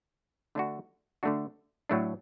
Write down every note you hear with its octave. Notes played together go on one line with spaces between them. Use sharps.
D3 A3 D4 F#4
D3 A3 D4 F#4
A2 F#3 A3 D4